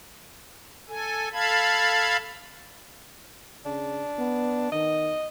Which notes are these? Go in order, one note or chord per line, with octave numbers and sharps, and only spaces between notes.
A4 G#5
A4 F5 A5 B5 G#6
C#3 D4
B3
D#3 D#5